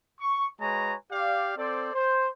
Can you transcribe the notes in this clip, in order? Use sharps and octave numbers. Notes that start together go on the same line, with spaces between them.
C#6
G#3 F#4 B4 C#5 G#5 A#5
G4 D5 F5
C4 A4 C5 D5
C5